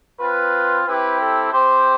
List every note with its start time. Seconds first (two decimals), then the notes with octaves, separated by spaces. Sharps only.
0.19 C4 F4 B4
0.86 C4 E4 G4 B4
1.20 A4
1.52 C4 G4 C5